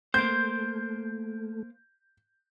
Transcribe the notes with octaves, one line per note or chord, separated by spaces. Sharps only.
A3 A#3 C5 G6